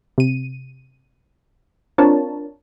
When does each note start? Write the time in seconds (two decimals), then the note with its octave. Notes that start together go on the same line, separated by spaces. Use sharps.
0.18 C3 D#7
1.98 C4 D4 F4 A#4 C#5 A5